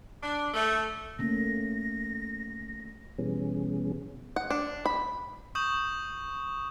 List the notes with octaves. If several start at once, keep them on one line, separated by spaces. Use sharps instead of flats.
D4
A3
A3 A#3 C#4 A#6
B2 E3 G3 B3 C#4 G#4
F#5
D4
B5
C#6 D#6 G6 E7 F#7